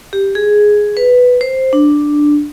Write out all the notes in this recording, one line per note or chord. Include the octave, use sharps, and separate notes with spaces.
G4
G#4
B4
C5
D4